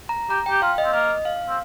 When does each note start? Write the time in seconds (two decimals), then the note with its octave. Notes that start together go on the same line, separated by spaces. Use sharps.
0.09 A#5
0.30 G4 A#5
0.46 G5
0.50 G4
0.62 F4 F5
0.78 D#5
0.84 C4
0.93 A#3 D#5
1.25 F5
1.49 C4